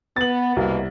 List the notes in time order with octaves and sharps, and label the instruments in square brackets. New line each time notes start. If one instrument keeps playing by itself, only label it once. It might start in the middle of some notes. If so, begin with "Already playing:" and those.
[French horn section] B3 [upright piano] A6 F#7
[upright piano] C2 [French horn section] B2 A#3